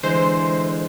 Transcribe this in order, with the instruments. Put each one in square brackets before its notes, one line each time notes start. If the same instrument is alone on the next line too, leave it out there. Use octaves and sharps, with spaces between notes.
[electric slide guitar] D3 E3 G#3 [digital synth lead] C5